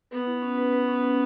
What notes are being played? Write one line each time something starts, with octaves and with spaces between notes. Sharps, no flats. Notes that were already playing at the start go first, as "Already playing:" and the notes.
B3 B4
E4
C#4
B4
B4
C#4
C#4